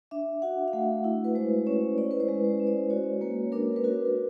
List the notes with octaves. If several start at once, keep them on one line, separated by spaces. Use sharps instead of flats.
D4 E5
F#4 F#5
F5
A3 F#5
E4
B4
G#3 C5
C#4 C#5
E4 D5
B4
C5
G#3
C5
C#4
D5
F#4 C#5
A#3 B4
D4 A#4
B4
F#4 A#4